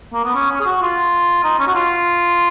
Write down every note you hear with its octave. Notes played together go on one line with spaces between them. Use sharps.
A#3
B3
C#4
C#4
G#4
F#4
F4
D#4
C#4
F#4
F4